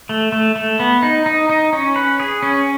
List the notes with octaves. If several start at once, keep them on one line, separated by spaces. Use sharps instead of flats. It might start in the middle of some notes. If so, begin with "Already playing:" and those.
A3
A3
A3
B3
D#4
D#4
D#4
C#4
B4
G#4
C#4